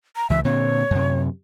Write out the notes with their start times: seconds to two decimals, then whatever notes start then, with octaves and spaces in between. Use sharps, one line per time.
0.16 A#5
0.30 C#2 E3 E5
0.45 A#2 D3 C4 C#5
0.91 F#2 C3